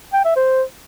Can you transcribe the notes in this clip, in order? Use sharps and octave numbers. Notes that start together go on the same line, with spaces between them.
G5
E5
C5